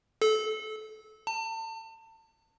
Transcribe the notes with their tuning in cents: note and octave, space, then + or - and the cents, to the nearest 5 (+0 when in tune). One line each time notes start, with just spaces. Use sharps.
A4 -25
A5 +35